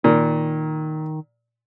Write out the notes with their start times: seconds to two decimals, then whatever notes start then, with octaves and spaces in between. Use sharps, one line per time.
0.04 A#2 D#3